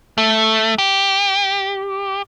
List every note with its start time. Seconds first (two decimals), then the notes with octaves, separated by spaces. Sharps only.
0.18 A3
0.78 G4